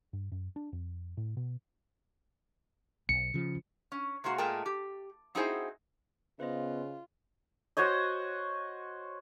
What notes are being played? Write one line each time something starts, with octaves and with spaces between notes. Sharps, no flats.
G2
F#2
D4
F2
A2
B2
B1 C#7
C#3 F3
C#4
C3 G#3 A#3 F#4
A#2 G#3 A3 A#4 G5 A5
G4
C4 D#4 E4 F#4 G#4 C5
C#3 B3 F4 B4 C5 D#5
F#4 C5 C#5 D#5